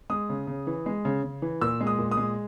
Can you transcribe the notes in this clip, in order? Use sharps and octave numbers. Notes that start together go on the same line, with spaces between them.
G#3 D#6
C#3
C#3
E3
G#3
C#3
C#3
E3
A#2 E6
G#3
D#6
A#2
D#6
G#3